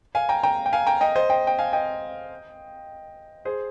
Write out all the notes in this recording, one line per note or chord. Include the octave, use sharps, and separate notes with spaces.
F5 G#5
G5 A#5
G5 A#5
G5
F5 G#5
G5 A#5
D#5 G5
C5 D#5
D#5 G5
G5
F5 G#5
D#5 G5
G#4 C5